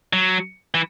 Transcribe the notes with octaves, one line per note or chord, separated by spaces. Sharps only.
F#3
E3